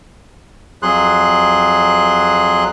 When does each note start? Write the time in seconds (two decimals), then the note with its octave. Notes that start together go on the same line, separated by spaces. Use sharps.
0.83 F2 F#3 G#4 C6 F#6